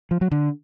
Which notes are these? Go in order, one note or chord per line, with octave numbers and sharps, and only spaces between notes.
F3
F#3
D3